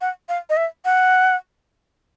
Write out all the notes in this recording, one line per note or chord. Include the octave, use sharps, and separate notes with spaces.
F#5
F5
D#5
E5
F#5